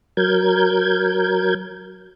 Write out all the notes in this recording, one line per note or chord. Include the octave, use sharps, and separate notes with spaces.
F#3 A#4 G6 G#6